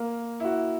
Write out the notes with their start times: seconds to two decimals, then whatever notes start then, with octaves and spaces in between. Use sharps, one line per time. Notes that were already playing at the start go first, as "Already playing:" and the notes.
Already playing: A#3
0.40 E4
0.45 F#4